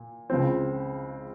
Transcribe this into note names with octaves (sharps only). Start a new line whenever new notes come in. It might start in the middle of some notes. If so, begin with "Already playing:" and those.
Already playing: A#2
C#2 C#3 F3 C4